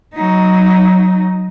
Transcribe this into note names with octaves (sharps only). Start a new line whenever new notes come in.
F#3 D#4